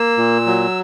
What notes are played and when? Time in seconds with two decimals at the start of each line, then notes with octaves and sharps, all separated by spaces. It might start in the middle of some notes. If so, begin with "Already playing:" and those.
Already playing: A#3 E6
0.17 A#2
0.47 F#3